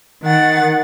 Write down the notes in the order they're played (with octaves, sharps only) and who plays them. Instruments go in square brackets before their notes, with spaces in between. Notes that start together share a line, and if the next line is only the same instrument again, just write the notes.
[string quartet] D#3 F#5 A6